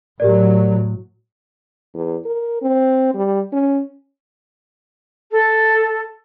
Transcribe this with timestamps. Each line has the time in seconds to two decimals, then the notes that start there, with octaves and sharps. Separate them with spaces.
0.20 A2 F#3 G4 A#4 D5
1.94 E2
2.25 A#4
2.62 C4
3.15 G3
3.53 C#4
5.30 A4